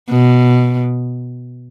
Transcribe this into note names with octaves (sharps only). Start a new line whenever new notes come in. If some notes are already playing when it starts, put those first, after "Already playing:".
B2